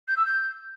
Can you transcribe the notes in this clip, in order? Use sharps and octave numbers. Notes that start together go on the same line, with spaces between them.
G6
E6
G6